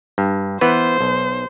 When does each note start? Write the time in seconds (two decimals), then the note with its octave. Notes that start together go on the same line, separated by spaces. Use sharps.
0.18 G2
0.61 E3 B3 B4 C5
1.00 B1